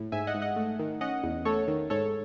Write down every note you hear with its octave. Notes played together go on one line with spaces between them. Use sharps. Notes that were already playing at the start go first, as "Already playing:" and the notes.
Already playing: A2
G#2 E5 G#5
D#5 F#5
G#2
D#5 F#5
A3
D#3
C#4 D#5 F#5
E2
A3 A4 C#5
D#3
G#2 A4 C#5